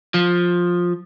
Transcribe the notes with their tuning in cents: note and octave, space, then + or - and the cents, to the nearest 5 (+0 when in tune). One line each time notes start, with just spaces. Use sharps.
F3 +10